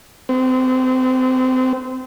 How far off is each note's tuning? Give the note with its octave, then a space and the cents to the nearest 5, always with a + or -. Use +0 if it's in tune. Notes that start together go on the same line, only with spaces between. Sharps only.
C4 -25